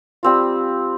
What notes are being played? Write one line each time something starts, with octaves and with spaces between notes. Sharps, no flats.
G3 C4 F4